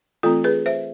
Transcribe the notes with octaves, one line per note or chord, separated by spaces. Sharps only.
E3 A3 C4 F4 A4
G#4 B4
C5 E5